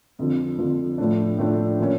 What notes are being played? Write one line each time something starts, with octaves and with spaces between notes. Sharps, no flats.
F2 D3 F3
F2 D3 F3
A2 F3 A3 D4
A2 F3 A3 D4
A#2 F3 C#4